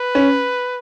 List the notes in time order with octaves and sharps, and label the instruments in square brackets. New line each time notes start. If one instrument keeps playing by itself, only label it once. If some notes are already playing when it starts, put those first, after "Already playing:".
Already playing: [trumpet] B4
[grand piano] C#4